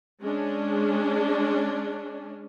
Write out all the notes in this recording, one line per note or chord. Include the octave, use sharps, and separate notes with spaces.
G#3 C#4 D4